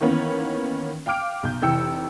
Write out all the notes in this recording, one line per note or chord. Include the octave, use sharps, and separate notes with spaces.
D#3 E3 A#3 B3 C#4
F5 G5 D6 F6 D7
B1 G6
F1 E3 G5 E6 C#7